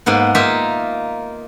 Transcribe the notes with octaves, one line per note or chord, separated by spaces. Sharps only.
G#2 A#3 B3
A#3 D#4 F4 E5